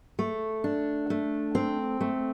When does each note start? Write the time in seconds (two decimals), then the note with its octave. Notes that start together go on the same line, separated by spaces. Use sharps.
0.19 A3
0.64 D4
1.10 A3
1.55 C4
2.01 A3